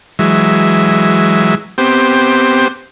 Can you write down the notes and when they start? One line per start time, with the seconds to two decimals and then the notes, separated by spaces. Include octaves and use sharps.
0.19 E3 F#3 G#3 E5
1.78 B3 C4 G4 C5